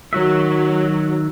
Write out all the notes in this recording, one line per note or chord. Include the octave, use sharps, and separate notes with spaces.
D#3 F#3 F#4 E5